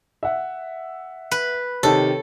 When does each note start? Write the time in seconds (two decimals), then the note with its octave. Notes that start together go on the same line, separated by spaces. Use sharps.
0.23 E5 F#5
1.31 B4
1.83 C3 D#3 A4 C#5 A5